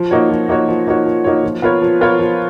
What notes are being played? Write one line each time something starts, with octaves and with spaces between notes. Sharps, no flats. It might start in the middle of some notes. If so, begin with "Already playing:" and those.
Already playing: F3
A#3 D#4 F#4 C#5
F3
A#3 D#4 F#4 C#5
F3
A#3 D#4 F#4 C#5
F3
A#3 D#4 F#4 C#5
F3
B3 F4 A#4 C#5
F3
B3 F4 A#4 C#5
F3